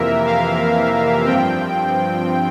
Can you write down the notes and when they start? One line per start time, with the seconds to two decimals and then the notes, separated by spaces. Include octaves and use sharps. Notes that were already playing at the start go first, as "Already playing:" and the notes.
Already playing: F2 C3 E3 A#3 A#4 E5
0.26 F5
1.26 G2 F3 C4 G5